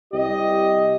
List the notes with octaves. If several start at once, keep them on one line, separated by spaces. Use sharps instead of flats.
C2 G4 D#5